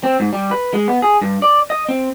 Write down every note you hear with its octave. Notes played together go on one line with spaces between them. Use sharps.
C4
G#2
G3
B4
G#3
B3
G#4
G2
D5
D#5
C4